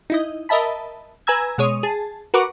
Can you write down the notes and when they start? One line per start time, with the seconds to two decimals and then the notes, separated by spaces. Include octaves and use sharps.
0.10 D#4 E4 D#5
0.49 A#4 D#5 E5 A5 B5
1.27 B4 G#5 A#5 E6 G#6
1.58 B2 G#3 C#5 D#6
1.83 G#4 A5
2.34 F#4 A#4 B4 F#5 C#6 D6